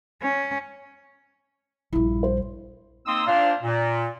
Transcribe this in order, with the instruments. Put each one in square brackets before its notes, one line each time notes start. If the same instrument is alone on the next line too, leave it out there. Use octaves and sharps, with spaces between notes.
[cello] C#4
[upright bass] A#1 G2 [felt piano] E4
[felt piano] C5
[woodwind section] A#3 C4 D#4 C6 D#6 E6
A#2 D4 C5 F5
A#2